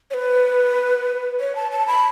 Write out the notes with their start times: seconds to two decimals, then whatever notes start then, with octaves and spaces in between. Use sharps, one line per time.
0.11 C#5
0.14 B4
1.40 C#5
1.56 A5
1.71 A5
1.88 B5